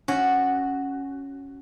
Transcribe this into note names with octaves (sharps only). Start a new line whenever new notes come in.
C#4 F#4